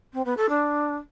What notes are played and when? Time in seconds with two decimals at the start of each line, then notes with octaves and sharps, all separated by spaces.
0.13 C4
0.25 B3
0.37 A4
0.49 D4